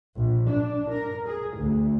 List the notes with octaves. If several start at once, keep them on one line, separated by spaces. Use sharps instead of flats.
A#1
D4
A#4
G#4
D2